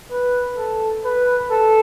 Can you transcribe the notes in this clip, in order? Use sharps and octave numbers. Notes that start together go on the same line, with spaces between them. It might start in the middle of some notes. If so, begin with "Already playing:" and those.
B4
A4
B4
A4